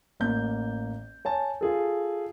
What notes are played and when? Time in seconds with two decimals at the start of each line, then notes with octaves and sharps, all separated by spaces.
0.20 A1 A#3 G6
1.25 C#5 G#5 A5
1.61 F4 G#4 A4